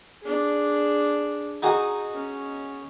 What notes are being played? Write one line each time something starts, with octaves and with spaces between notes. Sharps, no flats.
D4 G#4
D#4 F#4 G#4
C#4